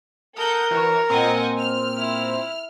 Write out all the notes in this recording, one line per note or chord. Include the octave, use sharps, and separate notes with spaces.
A4 A#4 F#5 D#6 G6
E3 F#4 C#5
A#2 C4 D#5 F#5 G#5
F6
E4